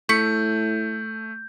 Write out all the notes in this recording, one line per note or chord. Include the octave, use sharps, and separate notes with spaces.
A2 A3 C#6 G6 B6 C#7